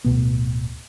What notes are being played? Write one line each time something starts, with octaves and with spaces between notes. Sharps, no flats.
D1 G#2 B2 B3